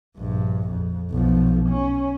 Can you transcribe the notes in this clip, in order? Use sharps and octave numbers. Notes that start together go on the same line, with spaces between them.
A#1 G2
F2
B1 F3
C#4